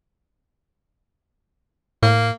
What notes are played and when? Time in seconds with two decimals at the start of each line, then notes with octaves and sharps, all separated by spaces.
2.03 A2 A#3